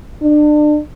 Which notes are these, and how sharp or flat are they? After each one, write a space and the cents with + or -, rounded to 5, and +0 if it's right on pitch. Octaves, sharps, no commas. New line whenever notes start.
D4 +30